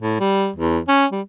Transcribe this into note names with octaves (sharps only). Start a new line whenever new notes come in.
A2
G3
E2
C#4
G3